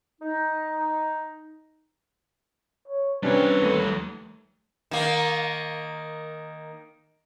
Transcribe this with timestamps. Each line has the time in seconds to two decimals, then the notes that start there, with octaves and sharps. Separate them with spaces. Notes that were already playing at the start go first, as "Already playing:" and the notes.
0.21 D#4
2.88 C#5
3.23 C3 G3 C#4 D4 B4 C#5
3.62 D#2 A3 D#7
4.91 D#3 A#3